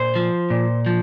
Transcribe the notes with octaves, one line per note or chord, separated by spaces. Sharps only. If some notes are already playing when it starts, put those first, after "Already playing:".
Already playing: A#2 C5
F3
A#2
F3